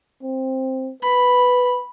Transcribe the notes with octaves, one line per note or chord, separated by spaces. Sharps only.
C4
B4 B5